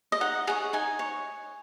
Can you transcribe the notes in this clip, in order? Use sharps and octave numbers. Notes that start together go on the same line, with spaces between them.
D#5
D#4 F#5
G#4 C#5 F#5
D#4 G#5
C#5